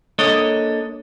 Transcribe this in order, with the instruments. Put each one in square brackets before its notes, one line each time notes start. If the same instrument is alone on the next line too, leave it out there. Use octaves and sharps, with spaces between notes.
[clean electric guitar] A#3 D4 A4 C#5 D#5